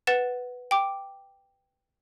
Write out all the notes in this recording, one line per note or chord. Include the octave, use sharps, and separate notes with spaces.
B4 F#5 A6 E7
G5 D6